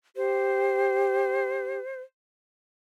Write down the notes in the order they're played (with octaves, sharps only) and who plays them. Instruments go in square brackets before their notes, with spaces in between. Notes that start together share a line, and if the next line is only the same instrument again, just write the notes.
[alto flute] G4 [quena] C5